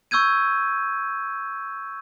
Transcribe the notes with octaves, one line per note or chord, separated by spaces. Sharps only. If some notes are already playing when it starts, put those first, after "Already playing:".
C#6 E6 G6 G#6 D#7